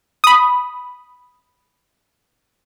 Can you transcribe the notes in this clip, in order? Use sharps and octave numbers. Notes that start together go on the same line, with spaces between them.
B5 D#6